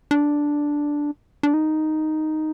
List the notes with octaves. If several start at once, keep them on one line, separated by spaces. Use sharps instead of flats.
D4
D4
D#4